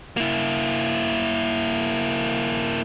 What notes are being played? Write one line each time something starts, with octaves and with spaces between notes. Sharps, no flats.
A#3 E4